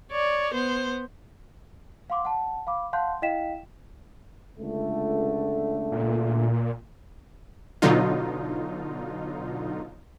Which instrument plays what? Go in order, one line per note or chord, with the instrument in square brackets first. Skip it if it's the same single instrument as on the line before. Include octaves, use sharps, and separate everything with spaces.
[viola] C#5 D5
B3 C5
[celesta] F5 F#5 C6 D6
F#5 A5
F5 B5 D6
F5 F#5 A5 C6 F#6 G6
E4 D#5 F5 G5 B6 E7
[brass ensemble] C#2 D3 A3
[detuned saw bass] A#2
[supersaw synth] B2 D3 F#3 D#4 F4